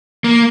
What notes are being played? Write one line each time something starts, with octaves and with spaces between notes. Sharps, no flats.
A#3